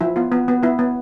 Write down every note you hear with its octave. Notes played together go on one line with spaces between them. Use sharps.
F3 E4
B3 F4
B3
B3
B3 E4
B3